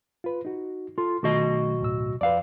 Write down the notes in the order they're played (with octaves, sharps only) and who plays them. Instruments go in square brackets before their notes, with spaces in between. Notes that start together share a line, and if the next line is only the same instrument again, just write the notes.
[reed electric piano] F4 B4
D#4 F#4
[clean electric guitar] F4 [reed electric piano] A4
[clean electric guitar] B1 F#4 D#5 [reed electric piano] D#3 A3
[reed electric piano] D2 A2 E6
[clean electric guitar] F2 F5 [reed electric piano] B4 D5